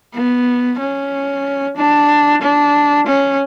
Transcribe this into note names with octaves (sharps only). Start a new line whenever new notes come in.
B3
C#4
D4
D4
C#4